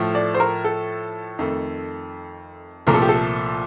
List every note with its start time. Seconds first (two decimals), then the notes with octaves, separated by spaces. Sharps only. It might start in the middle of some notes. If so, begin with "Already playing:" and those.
Already playing: A2 F3 A3
0.15 D5
0.34 C5
0.40 A#4
0.64 A4
1.39 F2 D#3 A3
2.87 C2 A#2 F3 A3 A#4
2.94 A4
3.02 G4
3.09 A4